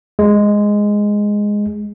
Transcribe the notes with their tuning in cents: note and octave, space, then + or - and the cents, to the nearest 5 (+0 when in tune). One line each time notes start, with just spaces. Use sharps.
G#3 -5